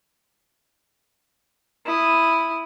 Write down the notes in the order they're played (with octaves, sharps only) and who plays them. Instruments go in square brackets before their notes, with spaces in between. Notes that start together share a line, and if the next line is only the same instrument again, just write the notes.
[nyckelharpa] E4 D#6